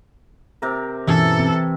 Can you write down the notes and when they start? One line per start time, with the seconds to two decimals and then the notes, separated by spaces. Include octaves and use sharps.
0.62 C3 A#4
1.07 G2 B2 E3 C#4 A4 E5 G#5
1.40 C4